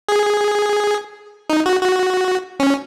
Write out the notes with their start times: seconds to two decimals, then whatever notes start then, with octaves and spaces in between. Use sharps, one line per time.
0.09 G#4
1.50 D#4
1.66 F#4
1.81 F#4
2.60 C#4